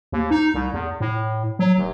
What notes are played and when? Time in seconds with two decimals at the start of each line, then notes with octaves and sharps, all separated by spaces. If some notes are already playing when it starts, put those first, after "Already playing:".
0.12 D#2
0.31 D#4
0.54 C2
0.73 E2
1.00 A2
1.59 F#3
1.77 F1